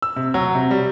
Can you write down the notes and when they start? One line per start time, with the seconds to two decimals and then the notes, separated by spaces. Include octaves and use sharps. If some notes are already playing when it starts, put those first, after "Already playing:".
0.02 E6
0.16 C3
0.34 F#3
0.55 C3
0.71 G3